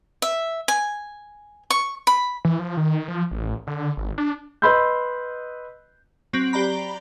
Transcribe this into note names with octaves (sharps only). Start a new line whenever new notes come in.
E5
G#5
C#6
B5
E3
F3
D#3
D#3
F3
A1
D3
G#1
D4
B4 D#5 B5 C6 E6 G6
F#3 C4 A#6 D7 F#7
G4 D5 A#5 B5